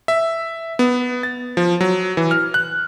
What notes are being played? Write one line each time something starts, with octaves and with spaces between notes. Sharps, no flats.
E5
B3
A6
F3
F#3
E3
F6
F#6